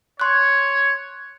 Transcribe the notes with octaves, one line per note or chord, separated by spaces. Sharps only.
C#5 C6 F#6